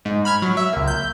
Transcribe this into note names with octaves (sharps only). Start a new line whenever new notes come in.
G#2
B5 F6 G#6
F#3
E5
C#2 A#3
G6